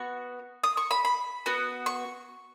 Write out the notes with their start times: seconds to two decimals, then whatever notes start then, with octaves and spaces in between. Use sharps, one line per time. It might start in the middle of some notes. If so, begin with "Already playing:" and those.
Already playing: B3 F#4 C#6
0.64 D#6
0.77 C#6
0.91 B5
1.05 B5
1.46 B3 F#4
1.86 C#6